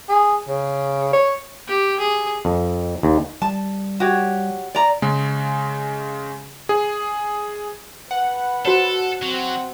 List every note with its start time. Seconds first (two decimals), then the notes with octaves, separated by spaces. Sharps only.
0.09 G#4
0.48 C#3
1.13 C#5
1.67 G4
1.99 G#4
2.45 F2
3.03 D#2
3.42 G3 A5
4.00 F#4 G4 C#5
4.75 D5 A#5
5.02 C#3 G#3
6.69 G#4
8.11 B4 F#5
8.65 F#4 A4 C5 C#5
9.22 F#3 C4